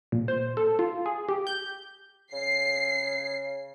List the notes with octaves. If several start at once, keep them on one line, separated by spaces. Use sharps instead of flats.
A#2
C5
A4
F4
G#4
G4
G6
C#3 C7